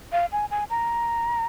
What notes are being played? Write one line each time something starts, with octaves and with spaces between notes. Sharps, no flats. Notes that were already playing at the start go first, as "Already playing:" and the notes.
F5
G#5
G#5
A#5